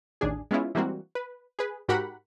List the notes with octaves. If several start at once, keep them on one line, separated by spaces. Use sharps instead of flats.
A1 D#2 D4 G#4
G#3 B3 C#4 E4 F4
E3 G3 G#3 A#3 C4 F#4
B4
G#4 B4
G#2 F#4 G4 A#4 F#5 B5